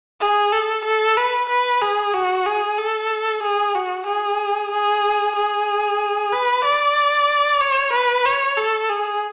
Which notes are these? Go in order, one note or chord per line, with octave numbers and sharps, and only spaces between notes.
G#4
A4
A4
B4
B4
G#4
F#4
G#4
A4
G#4
F#4
G#4
G#4
G#4
B4
D5
C#5
B4
C#5
A4
G#4